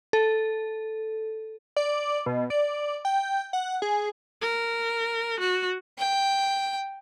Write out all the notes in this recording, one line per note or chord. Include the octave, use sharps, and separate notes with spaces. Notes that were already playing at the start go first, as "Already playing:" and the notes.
A4
D5
B2
D5
G5
F#5
G#4
A#4
F#4
G5